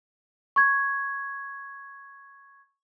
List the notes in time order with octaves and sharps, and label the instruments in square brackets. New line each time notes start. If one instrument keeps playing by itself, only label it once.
[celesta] C#6 G#6